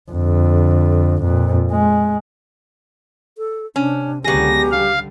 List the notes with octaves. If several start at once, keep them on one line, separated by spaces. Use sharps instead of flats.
F2 D3
F2 A#2
G#3
A4
C3 C#4 D4
C#2 D3 F#3 B3 G4 G#4 A#6
D3 G3 F5